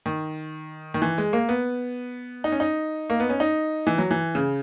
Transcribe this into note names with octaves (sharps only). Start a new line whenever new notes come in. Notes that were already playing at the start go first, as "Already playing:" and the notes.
D#3
D#3
E3
G#3
A#3
B3
D#4
C#4
D#4
A#3
B3
C#4
D#4
E3
F#3
E3
C#3